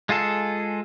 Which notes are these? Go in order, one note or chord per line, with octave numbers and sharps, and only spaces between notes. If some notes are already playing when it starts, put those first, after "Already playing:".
G#3 F4 G#4 A4